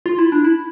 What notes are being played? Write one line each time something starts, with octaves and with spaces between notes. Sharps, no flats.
F4
E4
D4
E4